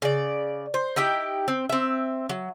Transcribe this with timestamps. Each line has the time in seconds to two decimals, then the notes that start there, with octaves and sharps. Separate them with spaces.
0.02 C#3 D5
0.74 C5
0.96 D#4 E4 G4 G5
1.48 C4
1.69 C4 E5
2.29 F#3